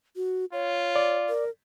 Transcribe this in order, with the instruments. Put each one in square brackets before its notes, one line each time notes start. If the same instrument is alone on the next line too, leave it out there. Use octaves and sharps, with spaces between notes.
[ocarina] F#4
[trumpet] F4 [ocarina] C#5
[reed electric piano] D5
[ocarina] A#4